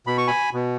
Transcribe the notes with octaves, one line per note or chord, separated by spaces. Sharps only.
B2 B5
C#6
G#5 B5
B2